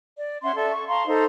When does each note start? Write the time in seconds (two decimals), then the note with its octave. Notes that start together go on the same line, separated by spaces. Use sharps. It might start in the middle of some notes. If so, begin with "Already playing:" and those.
0.16 D5
0.42 C#4 E5 F#5 C6
0.55 A4 D5 E5
0.72 C#6
0.87 F5 A5 A#5 C6
1.07 D#4 A4 C5